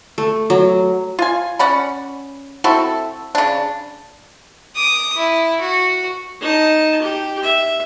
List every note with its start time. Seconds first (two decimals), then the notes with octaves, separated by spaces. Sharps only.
0.18 A3
0.50 F#3
1.19 F4 G#5
1.59 C#4 D5 F#5 B5
2.64 C4 E4 F#4 A4
3.35 C#3 D4
4.76 D6 D#6
5.16 E4
5.61 F#4
6.41 D#4 A5
7.02 G4
7.43 E5